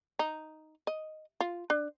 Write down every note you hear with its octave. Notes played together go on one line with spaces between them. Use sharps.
D#4
D#5
F4
D4